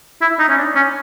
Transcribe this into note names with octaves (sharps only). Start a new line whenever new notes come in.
E4
D#4
C#4
D4
C#4